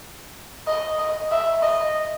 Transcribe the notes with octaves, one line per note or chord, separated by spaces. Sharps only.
D#5
D#5
E5
D#5